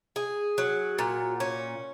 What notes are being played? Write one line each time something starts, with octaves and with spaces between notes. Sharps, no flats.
G#4
F#3
A#2
C#4